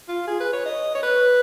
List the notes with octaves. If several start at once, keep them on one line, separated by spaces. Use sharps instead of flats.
F4
G#4
B4
C#5
D#5
C#5
B4